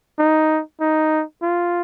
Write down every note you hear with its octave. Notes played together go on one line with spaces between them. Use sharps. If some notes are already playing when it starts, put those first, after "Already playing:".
D#4
D#4
F4